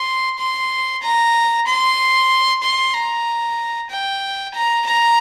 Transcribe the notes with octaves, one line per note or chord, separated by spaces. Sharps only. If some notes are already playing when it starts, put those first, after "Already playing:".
Already playing: C6
C6
A#5
C6
C6
A#5
G5
A#5
A#5